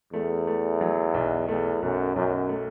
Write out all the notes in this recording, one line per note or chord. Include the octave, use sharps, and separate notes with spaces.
E2 A3
A3
F#3
B1
E2 A3
B1 F#2
B1 F#2
A3